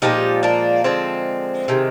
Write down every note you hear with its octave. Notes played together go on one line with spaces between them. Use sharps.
A#2 F3 G#3 D#4 G4
A#3 D4
D3 F3 G#3 C4
C3 D#3 G#3